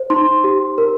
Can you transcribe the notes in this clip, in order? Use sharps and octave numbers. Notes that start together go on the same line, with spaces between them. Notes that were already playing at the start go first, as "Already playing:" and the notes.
Already playing: C5
D#4 C6
G4
A#4